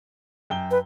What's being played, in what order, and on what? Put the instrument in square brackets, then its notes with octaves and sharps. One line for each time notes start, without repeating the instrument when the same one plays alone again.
[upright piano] F#2 G5 G7
[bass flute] B4